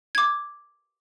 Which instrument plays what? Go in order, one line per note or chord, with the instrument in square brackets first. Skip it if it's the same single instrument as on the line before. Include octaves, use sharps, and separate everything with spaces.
[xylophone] D6 G#6